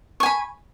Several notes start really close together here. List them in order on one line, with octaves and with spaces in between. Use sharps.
C#6 G#5 B5